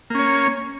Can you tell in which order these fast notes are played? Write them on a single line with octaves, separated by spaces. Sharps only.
A#3 C#4 C#5